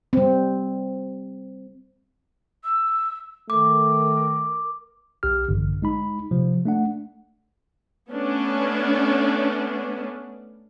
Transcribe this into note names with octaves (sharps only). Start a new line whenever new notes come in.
G3 C4
E6
D#3 A3 A#4 D6
B1 G4 F6
A1 G2 D3
G#3 D#4 B5
C3 F3
A3 D4 F#5
A3 B3 C#4 D4